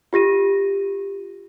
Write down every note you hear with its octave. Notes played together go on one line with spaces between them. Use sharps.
F4 G4 A#6 D#7